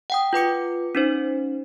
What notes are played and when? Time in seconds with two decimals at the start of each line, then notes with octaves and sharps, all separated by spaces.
0.10 F#5 G5 D#6
0.33 F4 B4 D6 C#7
0.95 C#4 D#4 C5